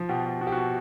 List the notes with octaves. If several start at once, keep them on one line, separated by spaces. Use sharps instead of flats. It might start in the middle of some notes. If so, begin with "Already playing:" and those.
Already playing: F3
B2 G4
B2
B2 F#4
G4
F#4
B2